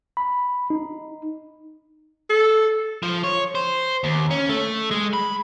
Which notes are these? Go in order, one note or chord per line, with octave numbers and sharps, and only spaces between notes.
B5
D#4
A4
F3
C#5
C5
D#2
C#4
A3
G#3
B5